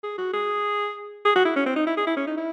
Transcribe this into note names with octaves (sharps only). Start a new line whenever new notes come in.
G#4
F#4
G#4
G#4
F#4
E4
C#4
C4
D#4
E4
G#4
E4
C#4
D#4
E4